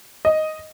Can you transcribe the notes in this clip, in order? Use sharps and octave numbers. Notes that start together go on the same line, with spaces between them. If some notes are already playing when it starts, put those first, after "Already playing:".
D#5